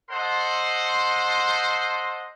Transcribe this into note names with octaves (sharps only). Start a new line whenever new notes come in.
A4 C5 D#5 F#5 C6